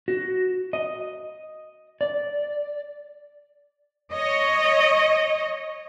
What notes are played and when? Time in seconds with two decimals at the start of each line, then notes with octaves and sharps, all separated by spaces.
0.08 F#4
0.73 D#5
2.01 D5
4.13 C#5 D#5